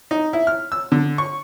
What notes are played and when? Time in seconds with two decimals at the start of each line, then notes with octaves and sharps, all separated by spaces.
0.11 D#4
0.33 E4
0.47 F6
0.72 E6
0.92 D3
1.18 C#6